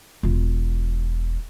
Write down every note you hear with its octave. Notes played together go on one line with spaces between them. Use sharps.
E1 F4